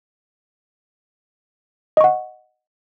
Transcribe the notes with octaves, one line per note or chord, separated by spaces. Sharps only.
D#5 F#5 C#6